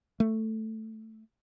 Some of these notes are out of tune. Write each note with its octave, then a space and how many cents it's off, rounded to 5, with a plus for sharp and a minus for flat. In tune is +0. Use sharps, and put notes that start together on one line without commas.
A3 +5